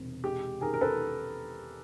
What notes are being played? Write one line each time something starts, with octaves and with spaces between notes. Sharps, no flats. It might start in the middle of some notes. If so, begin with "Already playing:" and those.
Already playing: E1 C3
G#3 G4
D#3 G#4 A#4
A#4
A4 B4